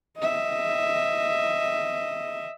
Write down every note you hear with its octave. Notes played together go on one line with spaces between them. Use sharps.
D#5 E5